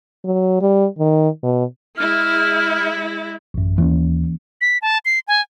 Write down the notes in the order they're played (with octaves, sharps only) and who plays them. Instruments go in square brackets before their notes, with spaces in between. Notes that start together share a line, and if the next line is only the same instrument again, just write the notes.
[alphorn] F#3
G3
D#3
B2
[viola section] G#3 E4 [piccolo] F6
[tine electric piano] A1 F#2
[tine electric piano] D#2 [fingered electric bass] E3 A#3 C#4
[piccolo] B6
A5
C7
G#5